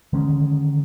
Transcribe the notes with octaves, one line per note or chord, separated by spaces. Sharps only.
D3 D#3 G#3 C#4